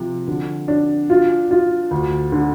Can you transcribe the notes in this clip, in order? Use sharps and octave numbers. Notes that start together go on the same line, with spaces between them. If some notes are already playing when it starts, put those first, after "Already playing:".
Already playing: C3 F3
D3
D4
F4
F4
D2
D3